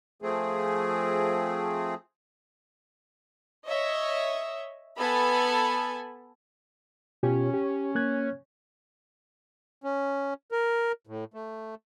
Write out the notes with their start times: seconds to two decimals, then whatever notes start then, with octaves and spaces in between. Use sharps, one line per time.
0.22 F3 A3 C4 G#4
3.67 C#5 D#5 E5
4.99 B3 A4 G#5 A5 B5
7.23 B2 C#4 F4 G4
7.54 G4
7.95 A#3 F#6 G#6
9.84 C#4
10.52 A#4
11.07 A2
11.34 A3